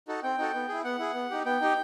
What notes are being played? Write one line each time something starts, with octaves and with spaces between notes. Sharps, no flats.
D#4 F#4 A4
C4 G5
D#4 F#4 A4
B3
E4 G#4
B3 F#5
E4 G#4
B3
D#4 G4
B3 G5
D#4 G4